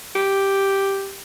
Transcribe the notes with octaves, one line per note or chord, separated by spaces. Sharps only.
G4